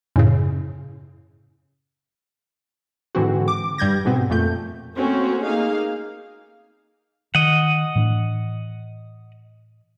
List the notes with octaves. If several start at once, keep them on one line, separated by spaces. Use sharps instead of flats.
F#2 A2 C#3
G#2 D3 E3 C4 F#4
D6
G2 G3 G6 G#6 A#6
G#2 B2 B3 C4
F2 A#2 A3 G6
A3 A#3 C4 C#4 F#4
A#3 D#4 G#4 F5
D#3 D#5 F#5
A2 E3 D4